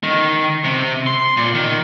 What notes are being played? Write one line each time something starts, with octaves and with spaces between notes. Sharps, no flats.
D#3
C3
C6
A#2
D#3